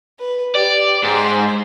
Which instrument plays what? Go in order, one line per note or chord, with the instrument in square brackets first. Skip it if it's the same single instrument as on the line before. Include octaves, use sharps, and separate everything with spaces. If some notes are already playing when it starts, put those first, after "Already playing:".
[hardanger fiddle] B4
[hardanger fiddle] G4 [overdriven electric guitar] D5
[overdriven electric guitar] G#2 [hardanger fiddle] C5